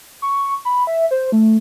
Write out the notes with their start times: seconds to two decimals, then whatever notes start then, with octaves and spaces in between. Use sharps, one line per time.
0.22 C#6
0.65 B5
0.87 E5
1.11 C5
1.32 A3